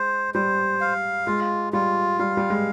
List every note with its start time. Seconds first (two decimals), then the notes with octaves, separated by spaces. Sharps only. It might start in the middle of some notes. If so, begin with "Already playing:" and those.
Already playing: G#3 C5
0.34 G3 C5
0.81 F5
1.27 G#3 F4
1.73 G3 F4
2.19 G3 F5
2.37 G3
2.50 G#3